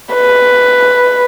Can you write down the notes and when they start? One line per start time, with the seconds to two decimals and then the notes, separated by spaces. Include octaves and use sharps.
0.14 B4